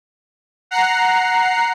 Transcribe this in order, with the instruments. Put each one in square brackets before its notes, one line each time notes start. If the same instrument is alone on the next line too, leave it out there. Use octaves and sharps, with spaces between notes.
[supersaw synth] F#5 A#5 C7